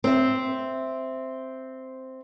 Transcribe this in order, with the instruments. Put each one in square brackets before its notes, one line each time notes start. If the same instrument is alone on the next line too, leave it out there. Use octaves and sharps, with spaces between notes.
[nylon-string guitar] C4 E5